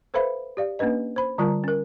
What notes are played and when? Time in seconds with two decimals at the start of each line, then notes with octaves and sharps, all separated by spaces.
0.14 A4 B4 C5 E5 F5 B5
0.57 G4 D5 F5
0.79 A#3 C#4 D4 B4 D#5
1.16 C5 B5
1.38 D3 G3 F4 A#4 A5 A#5
1.64 C#4 A#4